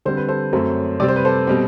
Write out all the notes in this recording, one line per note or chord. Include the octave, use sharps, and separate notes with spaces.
D3 G3 C4 C5
B4
A4 C5
F#2 F#3 A3 C4
C3 G3 C4 D5
C5
B4
A4 C5
B2 G3 C4